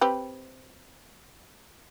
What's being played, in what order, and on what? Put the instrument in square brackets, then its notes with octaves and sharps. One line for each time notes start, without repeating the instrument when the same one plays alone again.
[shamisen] C4 G4 B4